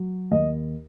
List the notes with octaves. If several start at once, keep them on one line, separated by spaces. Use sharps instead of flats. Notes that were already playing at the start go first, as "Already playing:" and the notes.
Already playing: F#3
D#2 D#5